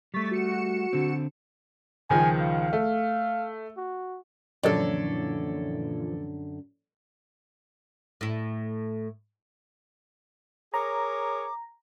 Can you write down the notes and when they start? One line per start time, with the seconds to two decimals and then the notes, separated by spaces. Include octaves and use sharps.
0.14 G3 A3 C#6 A6 B6
0.31 F#4 C#7 E7
0.93 D3 C4
2.10 C#2 D#3 F3 G#5
2.41 F5
2.73 A3
3.77 F#4
4.63 F#2 A#2 D3 E3 F3 A4 C#5 D5
8.21 A2 E4
10.74 G#4 A#4 C#5 A#5 D6